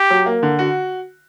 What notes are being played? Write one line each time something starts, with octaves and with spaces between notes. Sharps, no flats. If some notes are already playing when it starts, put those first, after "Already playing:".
Already playing: G4
F#3
A#3
D3
F#4